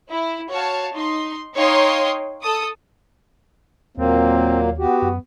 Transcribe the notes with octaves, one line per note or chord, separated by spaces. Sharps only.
E4
F#4 C#5 F5 A5
D#4 C6
D#4 C#5 F5 G5 C6 D#6
A4 D#6
D#2 A#2 F#3 A#3 C4
B3 F#4 G4
F#2